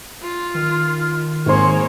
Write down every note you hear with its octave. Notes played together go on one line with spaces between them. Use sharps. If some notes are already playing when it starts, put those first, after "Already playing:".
F4
D#3 F6
G#1 A#3 G#4 C5 C#5 C6